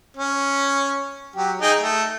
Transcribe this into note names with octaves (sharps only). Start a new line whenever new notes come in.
C#4
F#3 G4
D#4 G#4 G5
A3